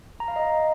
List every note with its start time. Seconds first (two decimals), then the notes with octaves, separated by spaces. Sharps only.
0.20 A#5
0.28 F5
0.36 D#5